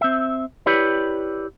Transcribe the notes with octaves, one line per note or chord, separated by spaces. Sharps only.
C4 E5
E4 G4 B4 C#5 D5